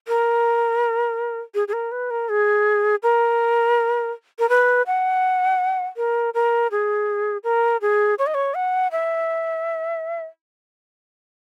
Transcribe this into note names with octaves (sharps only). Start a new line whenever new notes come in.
A#4
G#4
G#4
A#4
B4
A#4
G#4
A#4
A#4
B4
F#5
A#4
A#4
G#4
A#4
G#4
C#5
D#5
C#5
F#5
E5